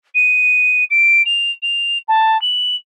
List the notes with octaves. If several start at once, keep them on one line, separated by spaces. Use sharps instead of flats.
D#7
D7
F7
F7
A5
F#7